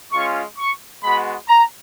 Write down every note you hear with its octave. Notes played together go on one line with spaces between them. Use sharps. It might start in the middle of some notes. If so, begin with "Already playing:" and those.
G#3 C#4 F4 C#6
C#6
G#3 B3 F#4 B5
A#5